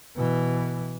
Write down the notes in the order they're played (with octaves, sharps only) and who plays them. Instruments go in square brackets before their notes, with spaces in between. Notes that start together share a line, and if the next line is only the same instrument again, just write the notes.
[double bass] B2 E3